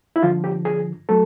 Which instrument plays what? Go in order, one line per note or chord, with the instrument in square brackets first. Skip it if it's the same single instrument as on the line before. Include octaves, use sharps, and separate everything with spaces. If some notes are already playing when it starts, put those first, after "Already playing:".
[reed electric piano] E4
G2 D3 F3 F4
G4
G#4
F#3 A3 A4